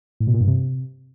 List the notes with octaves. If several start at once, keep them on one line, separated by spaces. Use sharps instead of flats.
A2
B2
A#2
G2
C3